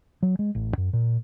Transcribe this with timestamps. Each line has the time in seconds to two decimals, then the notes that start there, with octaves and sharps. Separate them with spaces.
0.23 F#3
0.39 G#3
0.55 A1
0.78 F#2
0.93 A#2